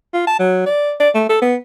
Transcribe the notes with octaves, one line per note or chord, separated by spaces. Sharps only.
F4
A5
F#3
D5
D5
A3
A4
B3